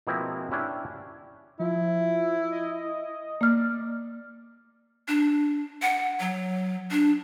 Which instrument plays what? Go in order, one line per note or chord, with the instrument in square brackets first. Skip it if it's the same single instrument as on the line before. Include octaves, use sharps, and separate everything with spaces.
[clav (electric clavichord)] B2 F3 G#3 A#3 C4 E4
C#4 D4 E4 G4
[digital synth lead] F3 [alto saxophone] E4
[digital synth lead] D#5
[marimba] A#3 F6 [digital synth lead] D5
[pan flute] D4
F#5
F#3
D4